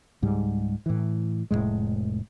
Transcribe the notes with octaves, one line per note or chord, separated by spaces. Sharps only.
C#2 G#2 G3
A2 E3
F1 D#2 A2 G#3